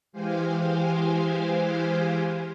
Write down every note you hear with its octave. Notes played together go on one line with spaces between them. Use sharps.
E3 G#3 G4 C5 F5 G#5